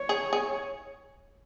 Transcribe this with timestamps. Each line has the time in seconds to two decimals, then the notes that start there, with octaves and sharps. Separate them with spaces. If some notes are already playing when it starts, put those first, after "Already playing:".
Already playing: C#5
0.09 G#4
0.33 G#4